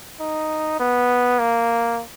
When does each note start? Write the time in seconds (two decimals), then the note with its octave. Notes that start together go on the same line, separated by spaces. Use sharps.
0.20 D#4
0.80 B3
1.39 A#3